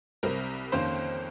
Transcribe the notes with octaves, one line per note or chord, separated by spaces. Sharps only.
C2 C3 G3 C4 A#4
F2 D#3 A#3 C#4 C5